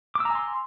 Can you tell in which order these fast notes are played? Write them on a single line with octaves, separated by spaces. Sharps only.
D6 E6 A#5 G#5 C6